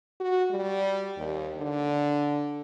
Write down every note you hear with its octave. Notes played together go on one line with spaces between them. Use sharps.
F#4
G3
D#2
D3